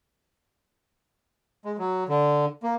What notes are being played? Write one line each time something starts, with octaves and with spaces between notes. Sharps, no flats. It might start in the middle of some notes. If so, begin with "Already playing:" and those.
G#3
F#3
D3
A#3